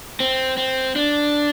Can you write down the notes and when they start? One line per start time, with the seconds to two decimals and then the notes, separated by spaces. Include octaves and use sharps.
0.20 C4
0.57 C4
0.96 D4